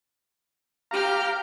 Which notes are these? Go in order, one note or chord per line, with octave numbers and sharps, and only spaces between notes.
G4 F5 A#5 F6 G6